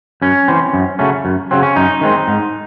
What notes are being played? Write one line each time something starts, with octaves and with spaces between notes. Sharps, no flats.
F#2 C#4
E3 C4
F#2
C#3 F#3 A3 C#4
F#2
C#3 F#3 C4
C#4
F#2 D#4
D#3 G#3 C4
G#2